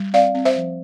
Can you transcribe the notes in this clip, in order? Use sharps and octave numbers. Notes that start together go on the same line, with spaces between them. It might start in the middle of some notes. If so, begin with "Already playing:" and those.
Already playing: G3
C4 D5 F5
C4
C5 E5
F3